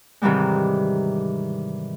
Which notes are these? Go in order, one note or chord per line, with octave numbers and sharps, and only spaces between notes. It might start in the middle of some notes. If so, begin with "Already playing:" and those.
G#2 C3 D#3 E3 G3 G#3